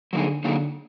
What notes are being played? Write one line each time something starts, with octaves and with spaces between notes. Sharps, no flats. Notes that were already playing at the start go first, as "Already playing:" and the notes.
D3 F#3 A#3 D#4 G#4
D3 F#3 A#3 D#4 G#4